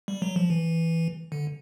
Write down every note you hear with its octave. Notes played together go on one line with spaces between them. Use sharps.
G3
F#3
F3
E3
D3